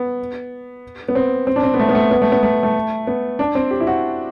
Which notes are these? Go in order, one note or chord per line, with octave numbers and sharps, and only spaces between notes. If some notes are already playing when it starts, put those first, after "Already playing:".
Already playing: B3
B3
C4
C4
D4
C4
B3
A3
B3
A3
B3
A3
B3
A3
A3
B3
D4
C4
G4
E4
F#4